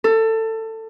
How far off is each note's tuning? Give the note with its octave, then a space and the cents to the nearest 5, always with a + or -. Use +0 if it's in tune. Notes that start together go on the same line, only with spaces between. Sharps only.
A4 +20